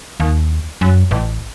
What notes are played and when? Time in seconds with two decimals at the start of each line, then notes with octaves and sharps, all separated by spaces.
0.20 D#2
0.81 F#2
1.11 A1